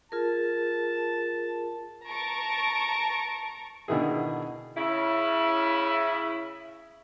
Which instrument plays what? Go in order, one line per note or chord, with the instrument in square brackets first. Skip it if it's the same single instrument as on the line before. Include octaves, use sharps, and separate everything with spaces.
[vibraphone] F4 G#4 A#4 [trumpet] A5
[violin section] A5 A#5 C#6 D7
[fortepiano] B2 D3 D#3 E4 G#4
[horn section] C#3 E4